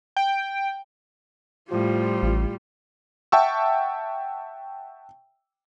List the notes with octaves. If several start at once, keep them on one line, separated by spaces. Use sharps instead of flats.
G5
A2 F3 G3 F4
A1
E5 F#5 G5 A5 C#6 E6